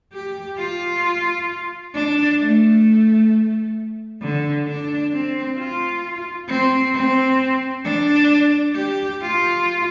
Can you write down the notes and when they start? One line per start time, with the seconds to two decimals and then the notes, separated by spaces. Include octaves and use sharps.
0.13 G4
0.58 F4
1.95 D4
2.39 A3
4.22 D3
4.67 D4
5.13 C4
5.58 F4
6.48 C4
6.94 C4
7.85 D4
8.75 G4
9.21 F4